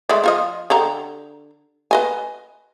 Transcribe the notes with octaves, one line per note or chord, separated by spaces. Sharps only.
G#3 A3 D5
F3 F4 D#5
D3 G4 A#5
B4 D#5 G#5